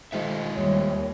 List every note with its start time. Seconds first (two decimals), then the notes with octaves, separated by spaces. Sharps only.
0.12 D#3 F3 G#3 A3 G4 E5 F5
0.55 D#2 G3 C#5